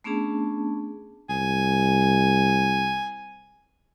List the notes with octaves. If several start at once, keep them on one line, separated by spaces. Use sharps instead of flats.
A3 B3 C#4 D4 G#4 A5
C2 G#5